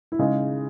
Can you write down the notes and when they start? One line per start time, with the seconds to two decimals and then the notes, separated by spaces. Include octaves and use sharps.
0.12 E4
0.19 C#3 G#3 D#4